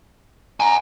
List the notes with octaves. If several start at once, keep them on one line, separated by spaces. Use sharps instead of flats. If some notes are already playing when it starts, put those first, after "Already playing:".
F#5 G#5 A#5